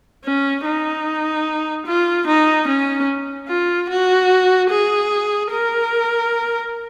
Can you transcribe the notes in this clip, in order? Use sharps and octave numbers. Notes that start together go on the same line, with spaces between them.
C#4
D#4
F4
D#4
C#4
F4
F#4
G#4
A#4